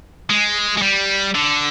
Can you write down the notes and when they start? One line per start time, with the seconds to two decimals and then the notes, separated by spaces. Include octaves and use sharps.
0.30 G#3
0.77 G#3
0.82 G3
1.35 D3